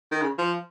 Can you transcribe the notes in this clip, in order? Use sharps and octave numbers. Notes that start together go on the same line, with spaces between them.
D#3
C#3
F3